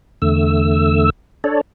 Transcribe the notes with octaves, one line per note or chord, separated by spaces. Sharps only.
E2 D3 A3 E6
D4 A4 C#5 D5